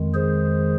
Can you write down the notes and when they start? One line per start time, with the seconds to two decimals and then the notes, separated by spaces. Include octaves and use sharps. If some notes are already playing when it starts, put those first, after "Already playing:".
Already playing: F2 D#3 G#3
0.14 G#4 C5